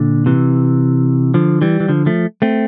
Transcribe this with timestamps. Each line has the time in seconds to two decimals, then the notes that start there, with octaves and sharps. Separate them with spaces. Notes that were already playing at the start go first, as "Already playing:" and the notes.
Already playing: A#2 D3
0.26 C3 E3
1.34 D3 F3
1.61 E3 G3
1.80 E3
1.89 D3 F3
2.06 F3 A3
2.42 A3 C4